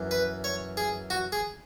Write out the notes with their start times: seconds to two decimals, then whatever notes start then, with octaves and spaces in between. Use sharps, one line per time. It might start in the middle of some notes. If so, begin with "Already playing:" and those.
Already playing: F#2 E3
0.11 B4
0.44 C#5
0.77 G#4
1.10 F#4
1.32 G#4